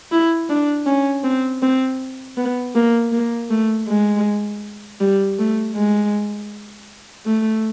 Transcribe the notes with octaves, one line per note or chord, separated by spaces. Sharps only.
E4
D4
C#4
C4
C4
B3
A#3
A#3
A3
G#3
G3
A3
G#3
A3